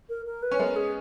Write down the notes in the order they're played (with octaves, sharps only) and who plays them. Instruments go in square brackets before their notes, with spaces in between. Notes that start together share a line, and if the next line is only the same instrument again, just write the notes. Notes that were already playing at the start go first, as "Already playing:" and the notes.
[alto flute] A#4
A#4
B4
[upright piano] C#4
[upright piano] G#3 B3 [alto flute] A#4
[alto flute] G#4